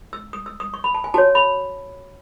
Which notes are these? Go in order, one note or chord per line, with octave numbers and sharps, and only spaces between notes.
E6
D#6
E6
D#6
C#6
B5
A5
G#5
F#4 C#5 A5
B5